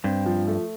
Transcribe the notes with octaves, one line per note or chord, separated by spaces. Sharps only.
G2 C4
F3
A3